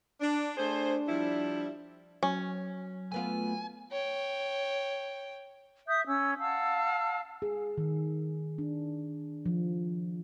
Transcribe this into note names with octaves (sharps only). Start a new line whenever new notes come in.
D4
A3 D4 G#4 C5
F3 G3 E4
F#3 C#4
A3 B3 F4 G#5
C#5 G5
E5 D#6 G6
C#4 E6
F5 F#5 A5 E6
G#4
D#3
D4
F3